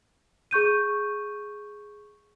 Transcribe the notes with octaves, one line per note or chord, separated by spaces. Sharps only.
G#4 C#6 G6 D#7